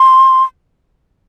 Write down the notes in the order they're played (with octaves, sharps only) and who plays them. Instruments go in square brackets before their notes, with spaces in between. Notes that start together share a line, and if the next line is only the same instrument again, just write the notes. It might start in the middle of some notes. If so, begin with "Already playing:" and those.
Already playing: [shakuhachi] C6